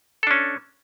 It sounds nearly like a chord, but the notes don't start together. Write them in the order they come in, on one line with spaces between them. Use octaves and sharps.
A4 D4 C#4